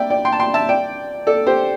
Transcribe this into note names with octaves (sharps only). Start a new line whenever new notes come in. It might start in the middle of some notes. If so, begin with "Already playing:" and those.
Already playing: D5 E5 G5
D5 G5
G5 C6
A5
G5 C6
E5 A5
D5 G5
A4 D5
G4 C5